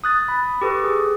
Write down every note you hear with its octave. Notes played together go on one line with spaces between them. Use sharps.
D#6 F#6 A6
B5
G4 A4 B4 C#6
G#4